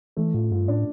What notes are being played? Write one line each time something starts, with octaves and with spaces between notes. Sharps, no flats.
E3 A3
A2 F4
G2 F4
A2 D4